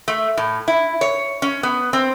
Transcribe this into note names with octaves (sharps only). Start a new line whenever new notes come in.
A3
A2
E4
C#5
C#4
B3
C4